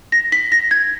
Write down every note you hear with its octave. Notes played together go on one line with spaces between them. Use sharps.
A#6
B6
A#6
G#6